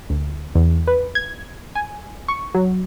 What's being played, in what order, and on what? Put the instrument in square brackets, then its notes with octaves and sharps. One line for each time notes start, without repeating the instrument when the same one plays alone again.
[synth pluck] D2
E2
B4
G#6
G#5
C#6
F#3